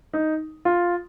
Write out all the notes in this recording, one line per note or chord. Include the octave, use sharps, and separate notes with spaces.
D#4
F4